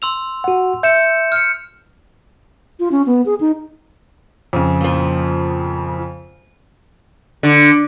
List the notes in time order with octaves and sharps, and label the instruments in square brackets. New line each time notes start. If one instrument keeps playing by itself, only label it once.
[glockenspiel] C6 E6 F7
[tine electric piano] F#4 F#5
[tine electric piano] E5 [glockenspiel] G6 C#7 E7
[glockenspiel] F6 C#7
[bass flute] F4
C#4
B3
G#4
D#4
[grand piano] F2 C#3
[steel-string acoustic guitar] A#2 F3
[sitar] D3